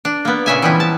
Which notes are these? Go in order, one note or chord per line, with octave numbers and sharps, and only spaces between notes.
D4
A#3 B3
A#2 C#3 E5 G#5
E3 F3 G3 B3 E4
A5